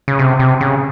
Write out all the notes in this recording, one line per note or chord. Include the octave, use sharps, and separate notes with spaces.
C#3
C3
C3
C#3